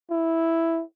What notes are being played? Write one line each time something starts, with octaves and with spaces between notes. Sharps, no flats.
E4